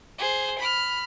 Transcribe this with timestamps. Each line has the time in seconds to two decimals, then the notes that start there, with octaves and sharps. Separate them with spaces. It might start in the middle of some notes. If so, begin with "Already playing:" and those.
0.18 G#4 C5
0.59 B5 F6